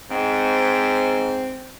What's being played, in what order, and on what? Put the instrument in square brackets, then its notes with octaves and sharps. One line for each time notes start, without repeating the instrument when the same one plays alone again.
[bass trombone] G#2 [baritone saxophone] C4